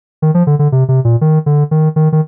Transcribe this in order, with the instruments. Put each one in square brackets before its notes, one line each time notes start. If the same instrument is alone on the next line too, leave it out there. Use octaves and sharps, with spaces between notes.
[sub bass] D#3
F3
D3
D3
C3
C3
A#2
D#3
D3
D#3
D#3
D#3